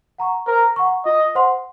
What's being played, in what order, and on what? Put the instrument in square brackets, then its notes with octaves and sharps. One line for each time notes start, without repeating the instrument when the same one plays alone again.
[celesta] F#5 A#5 C#6
[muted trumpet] A#4 [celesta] C5
[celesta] F#5 A#5 C#6
[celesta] F4 [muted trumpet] D#5
[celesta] C5 F#5 C6